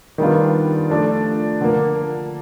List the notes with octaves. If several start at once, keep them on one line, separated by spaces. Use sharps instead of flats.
D#3 G3 B3 D4 F4
F3 A3 D4
D3 F3 A#3